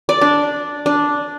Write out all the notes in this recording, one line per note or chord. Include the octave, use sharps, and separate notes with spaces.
D5
D4
D4